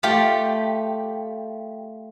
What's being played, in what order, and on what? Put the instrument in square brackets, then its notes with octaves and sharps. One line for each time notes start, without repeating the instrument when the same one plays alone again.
[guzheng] A3 F4 G4